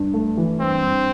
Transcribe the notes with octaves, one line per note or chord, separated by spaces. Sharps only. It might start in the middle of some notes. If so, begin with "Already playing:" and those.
Already playing: G2
A3
E3
G2 C4
G2